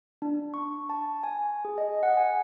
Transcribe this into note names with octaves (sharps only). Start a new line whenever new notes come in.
D4
C#6
A5
G#5
G#4
D#5
F#5
G#5